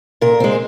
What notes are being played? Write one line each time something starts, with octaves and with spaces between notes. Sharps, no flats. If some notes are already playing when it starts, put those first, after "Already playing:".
A#2 A#4
G#3 C4